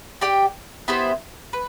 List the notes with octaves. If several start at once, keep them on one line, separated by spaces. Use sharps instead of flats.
G4 D5 G5
B3 E4 G4 C5
B4